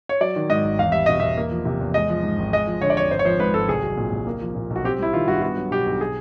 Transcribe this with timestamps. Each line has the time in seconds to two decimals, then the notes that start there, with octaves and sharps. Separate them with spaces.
0.09 C#5
0.21 F#3 D5
0.36 D#3
0.50 G#2 D#5
0.65 G#1
0.79 E2 F5
0.92 G3 E5
1.06 B2 D#5
1.20 E2 E5
1.37 A#3
1.51 F3
1.65 C3
1.81 E2
1.94 G#3 D#5
2.10 F3
2.23 G#2
2.38 G#1
2.53 G#3 D#5
2.67 F3
2.81 D3 C#5
2.90 D5
2.97 F2 C#5
3.10 G#1 C5
3.19 C#5
3.25 F3 C5
3.40 G#2 B4
3.54 G#1 A4
3.69 C2 G#4
3.83 F#3
3.97 A#2
4.13 C2
4.27 A#3
4.41 F3
4.55 A#2
4.70 B1
4.76 F#4
4.84 C4 G4
4.98 G3 E4
5.13 D#3 F4
5.28 G2 F#4
5.42 B3 F#4
5.57 F#3
5.71 B2 G4
5.86 B1
6.01 G#4